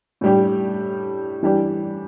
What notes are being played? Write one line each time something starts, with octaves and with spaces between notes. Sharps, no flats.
A2 G3 D4 G4
E3 G3 D4 G4